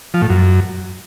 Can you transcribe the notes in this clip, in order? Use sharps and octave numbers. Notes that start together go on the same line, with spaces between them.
F3
A2
F#2